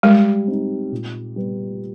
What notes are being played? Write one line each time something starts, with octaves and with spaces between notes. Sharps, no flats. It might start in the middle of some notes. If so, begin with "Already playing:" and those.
G3 G#3
C4 D#4
A#2
G3 B3